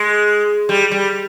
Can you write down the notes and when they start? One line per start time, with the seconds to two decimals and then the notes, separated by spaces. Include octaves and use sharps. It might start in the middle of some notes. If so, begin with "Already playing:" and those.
Already playing: G#3
0.69 G3
0.92 G3